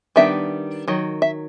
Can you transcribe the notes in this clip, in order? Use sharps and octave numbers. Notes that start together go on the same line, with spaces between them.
D#3 G3 B3 D4 E5
D#3 F#3
E5